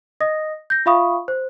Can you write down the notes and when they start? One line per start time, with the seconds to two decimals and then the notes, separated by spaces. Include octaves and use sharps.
0.21 D#5 D#6 A#6
0.70 G6 A#6
0.86 F4 E5 F5 B5 C#6 D#6
1.28 C5